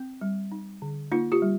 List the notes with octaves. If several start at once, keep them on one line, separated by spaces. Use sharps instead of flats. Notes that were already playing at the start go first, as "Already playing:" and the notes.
Already playing: C4
G3
D#4
D3
A#3 D#4 F4
F4 G4
G3